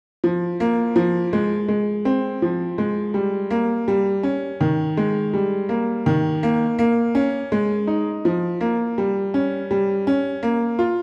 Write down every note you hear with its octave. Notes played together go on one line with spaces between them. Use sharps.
F3
A#3
F3
G#3
G#3
C4
F3
G#3
G3
A#3
G3
C#4
D#3
G#3
G3
A#3
D#3
A#3
A#3
C#4
G#3
D#4
F3
A#3
G3
C#4
G3
C#4
A#3
F4